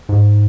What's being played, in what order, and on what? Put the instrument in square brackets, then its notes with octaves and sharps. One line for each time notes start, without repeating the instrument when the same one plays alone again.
[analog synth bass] G#2